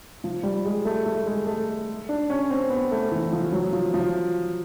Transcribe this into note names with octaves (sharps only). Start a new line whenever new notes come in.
F3
G3
G#3
A3
A3
G#3
A3
D4
C#4
C4
B3
A3
E3
F3
F#3
F3
F3